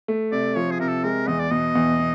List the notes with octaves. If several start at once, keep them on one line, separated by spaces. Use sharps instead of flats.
A3
C3 D5
F3 C#5
G#4
C3 A#4
A4
G#3 A#4
E2 D#5
D5
B2 D#5
E2
B2